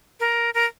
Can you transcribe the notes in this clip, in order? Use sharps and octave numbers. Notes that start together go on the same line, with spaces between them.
A#4
A#4